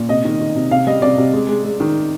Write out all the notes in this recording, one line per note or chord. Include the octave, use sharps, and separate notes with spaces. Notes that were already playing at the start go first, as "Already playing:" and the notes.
Already playing: A#2
C3 D#5
D#3
D#3
C3
C3 F5
G3 D#5
C3 D5
C3
G#3
G#3
G#3
D#3